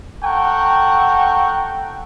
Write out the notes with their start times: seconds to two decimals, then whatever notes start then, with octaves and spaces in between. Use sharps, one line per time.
0.24 A4 F#5 G5 A#5 C#6